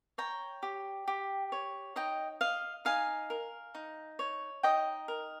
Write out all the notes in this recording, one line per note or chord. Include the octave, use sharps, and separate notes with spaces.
C#5 G5 A#5
G4
G4
C#5
D#4 D#5 G5
D#5 F5
D#4 F5 G#5
A#4
D#4
C#5
D#4 D#5 G5
A#4